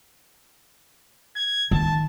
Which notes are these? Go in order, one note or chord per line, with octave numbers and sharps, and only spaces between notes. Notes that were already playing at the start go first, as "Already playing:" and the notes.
G#6
D#3 A5